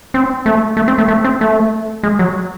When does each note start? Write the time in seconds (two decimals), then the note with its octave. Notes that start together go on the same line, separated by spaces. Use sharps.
0.14 C4
0.46 A3
0.77 A3
0.88 C4
0.98 A3
1.08 A3
1.24 C4
1.41 A3
2.03 G#3
2.19 F#3